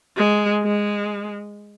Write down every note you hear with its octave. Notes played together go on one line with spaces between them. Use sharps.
G#3
G#3